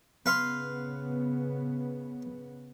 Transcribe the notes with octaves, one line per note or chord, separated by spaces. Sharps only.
C#3 B3 B4 F5 C6